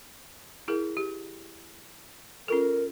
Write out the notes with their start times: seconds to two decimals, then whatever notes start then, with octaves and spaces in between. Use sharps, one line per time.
0.68 E4 G#4 A#4
0.97 G4
2.48 C#4 F4 A4 A#4